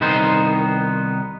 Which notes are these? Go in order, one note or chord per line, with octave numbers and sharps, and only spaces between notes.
C2 D#3 B3 D#4 C5 C6